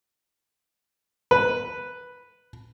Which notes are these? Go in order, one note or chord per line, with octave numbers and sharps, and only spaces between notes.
B4